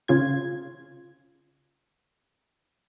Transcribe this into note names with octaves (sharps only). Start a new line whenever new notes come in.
C#3 F4 G#6